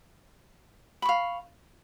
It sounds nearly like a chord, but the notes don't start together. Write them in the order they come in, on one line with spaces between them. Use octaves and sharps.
B5 C#6 F5